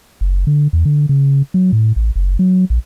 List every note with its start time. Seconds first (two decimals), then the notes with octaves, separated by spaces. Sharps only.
0.21 F#1
0.47 D3
0.73 E2
0.85 D3
1.09 C#3
1.54 F#3
1.72 A2
1.96 A1
2.16 F#1
2.39 F#3
2.70 A#1